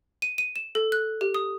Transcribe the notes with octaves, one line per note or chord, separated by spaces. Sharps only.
D#7
D#7
E7
A4
F#6
G4
D#6